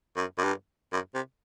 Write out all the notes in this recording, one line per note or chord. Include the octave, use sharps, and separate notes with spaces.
F#2
F#2
G2
F#2
C3